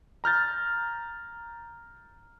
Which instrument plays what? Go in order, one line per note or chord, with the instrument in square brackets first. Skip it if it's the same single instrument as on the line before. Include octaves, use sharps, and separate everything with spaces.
[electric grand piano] A#5 F6 G6 A6